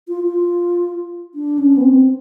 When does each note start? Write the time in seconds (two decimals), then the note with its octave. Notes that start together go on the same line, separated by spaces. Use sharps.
0.08 F4
0.24 F4
1.35 D4
1.58 C#4
1.77 B3
1.82 C4